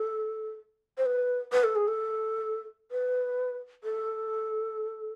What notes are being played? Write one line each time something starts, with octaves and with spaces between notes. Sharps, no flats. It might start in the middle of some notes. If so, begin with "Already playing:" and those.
Already playing: A4
C5
B4
B4
A4
G#4
A4
B4
A4